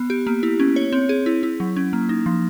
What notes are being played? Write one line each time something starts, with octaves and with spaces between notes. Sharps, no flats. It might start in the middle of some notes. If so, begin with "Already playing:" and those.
Already playing: B3
G4
A#3
E4
C#4
C#5
C4
G#4
E4
E4
F#3
C#4
A#3
D#4
F3